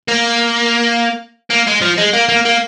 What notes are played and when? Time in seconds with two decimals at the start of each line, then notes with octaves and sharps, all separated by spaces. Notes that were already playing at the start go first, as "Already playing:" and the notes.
0.08 A#3
1.50 A#3
1.67 G#3
1.82 F3
1.98 G#3
2.13 A#3
2.29 A#3
2.45 A#3